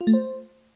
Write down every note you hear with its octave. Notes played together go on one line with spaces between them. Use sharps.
F4
A3
C5